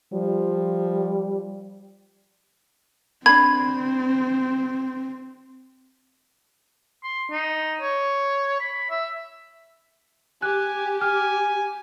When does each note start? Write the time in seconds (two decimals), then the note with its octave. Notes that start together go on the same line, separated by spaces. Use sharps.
0.13 F3 G3
3.26 C4 D4 B5 G#6
7.04 C6
7.31 D#4
7.81 C#5
8.60 B5
8.90 E5
10.42 G4 G#5 F#6
11.01 G#5 F6